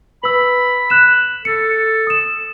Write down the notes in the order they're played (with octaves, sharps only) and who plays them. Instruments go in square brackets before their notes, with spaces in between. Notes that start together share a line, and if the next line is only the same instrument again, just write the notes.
[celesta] B4 E6 [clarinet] B5
[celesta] F#6 E7
[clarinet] A4 [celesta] C#7
[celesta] D#6 E7